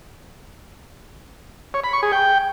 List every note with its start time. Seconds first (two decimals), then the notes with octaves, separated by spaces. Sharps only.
1.74 C#5
1.84 B5
1.93 C#6
2.03 G#4
2.12 G5